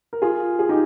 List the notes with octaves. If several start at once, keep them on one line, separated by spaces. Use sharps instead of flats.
A#4
F4 G#4
G#4
D#4 G4